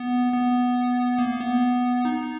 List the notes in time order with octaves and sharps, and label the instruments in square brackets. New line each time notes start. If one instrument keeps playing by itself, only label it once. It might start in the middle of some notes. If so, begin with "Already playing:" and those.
Already playing: [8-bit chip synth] B3
B3
A#3
B3
D#4